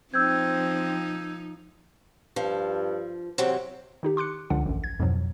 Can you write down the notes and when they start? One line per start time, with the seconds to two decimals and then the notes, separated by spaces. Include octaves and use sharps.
0.14 F3 C4 D#4 E6 G6 G#6
2.36 G2 F3
3.38 E2 C3 F#3 C4
4.03 D#3 D#4 G4
4.17 C6 D6 F#6 C#7
4.50 C#2 D3 F3 D4 F#5
4.66 A1 F#2
4.84 G#6
5.00 F2 G#2 B2 F3 F#3